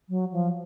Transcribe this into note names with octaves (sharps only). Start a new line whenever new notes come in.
F#3
F3